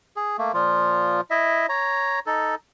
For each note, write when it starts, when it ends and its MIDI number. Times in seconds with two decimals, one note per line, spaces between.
0.16 0.37 68
0.38 0.52 57
0.38 0.52 58
0.54 1.21 46
0.54 1.21 53
0.54 1.21 65
1.31 1.66 64
1.31 1.66 75
1.31 1.66 76
1.69 2.20 73
1.69 2.20 82
2.26 2.55 63
2.26 2.55 69